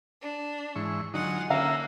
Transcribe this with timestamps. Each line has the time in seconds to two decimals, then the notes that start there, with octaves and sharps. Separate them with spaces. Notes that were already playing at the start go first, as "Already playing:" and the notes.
0.21 D4
0.75 G#2 E3 C#6
1.14 D3 F#3 D4 D#4 F4 D#5 F#5 G#5
1.50 D3 A#3 C#4 D4 E5 F5 A#5 E6